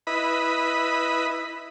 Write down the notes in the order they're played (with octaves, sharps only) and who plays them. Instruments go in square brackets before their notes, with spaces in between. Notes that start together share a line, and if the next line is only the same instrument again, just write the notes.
[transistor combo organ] E4 B4 D#5 B5